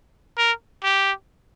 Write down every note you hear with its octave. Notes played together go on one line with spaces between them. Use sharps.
A#4
G4